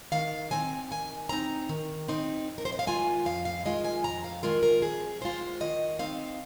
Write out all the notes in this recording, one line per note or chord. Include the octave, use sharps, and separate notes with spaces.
D#3 F5
C4 D#4 G#5
D#3 G#5
C4 D#4 A#5
D#3
C4 D#4
F2
A#4
C5
D#5
F5
D#3 G#3 F4 G#5
F2 F5
F5
D#3 G#3 F4 D#5
G#5
F2 A#5
F5
D#3 G#3 F4 A#4
A#4
F2 G#4
D#3 G#3 F4 C5
D#3 D#5
C4 D#4 F5